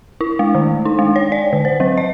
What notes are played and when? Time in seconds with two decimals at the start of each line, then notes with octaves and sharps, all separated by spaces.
0.21 E4
0.39 G#3
0.55 D#3
0.85 D#4
0.99 G#3
1.16 C#5
1.32 D5
1.53 D3
1.65 C5
1.80 F#3
1.98 D#5